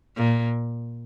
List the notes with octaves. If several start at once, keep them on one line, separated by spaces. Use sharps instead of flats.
A#2